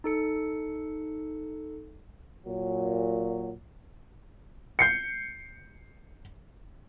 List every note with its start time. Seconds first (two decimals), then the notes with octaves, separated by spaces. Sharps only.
0.04 D#4 A4 C#7
2.47 A#2 F#3
4.79 G6 C7 C#7